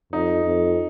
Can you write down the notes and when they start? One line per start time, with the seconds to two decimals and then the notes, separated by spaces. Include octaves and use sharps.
0.13 F2 D#4
0.45 F2